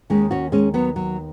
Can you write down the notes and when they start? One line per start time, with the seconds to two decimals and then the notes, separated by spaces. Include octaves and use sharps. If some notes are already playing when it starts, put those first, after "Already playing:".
0.10 D#2 D#3 G#3 C#4
0.31 C#4 F#4
0.52 G#3 C#4
0.74 F#3 B3
0.96 F#3